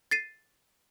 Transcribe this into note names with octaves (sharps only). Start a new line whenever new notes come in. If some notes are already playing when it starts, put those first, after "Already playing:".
A6 C7 D#7